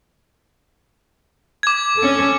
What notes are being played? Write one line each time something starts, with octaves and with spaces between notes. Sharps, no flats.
D6 G#6
C#4 A4